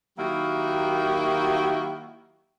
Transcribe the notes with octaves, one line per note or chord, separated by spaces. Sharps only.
D#3 F#3 A#3 E4 F#4 G4